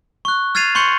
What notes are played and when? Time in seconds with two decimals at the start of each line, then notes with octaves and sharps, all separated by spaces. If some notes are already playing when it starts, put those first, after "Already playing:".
0.25 C#6 F#6
0.55 F6 G#6 A6 C7 D#7 F7
0.75 C6 C#6 G6 C#7